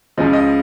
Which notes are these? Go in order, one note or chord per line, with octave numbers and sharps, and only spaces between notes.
C#2 C#3 F3 D#5
D#5